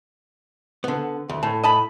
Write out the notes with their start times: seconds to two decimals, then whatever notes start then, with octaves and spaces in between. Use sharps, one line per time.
0.84 D3 B3
1.29 D2
1.43 A2 A5
1.63 D#5 A5 B5